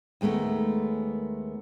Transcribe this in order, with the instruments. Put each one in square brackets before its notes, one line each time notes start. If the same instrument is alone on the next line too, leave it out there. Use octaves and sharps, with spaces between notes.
[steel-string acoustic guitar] D#2 G#3 A3 B3 A#4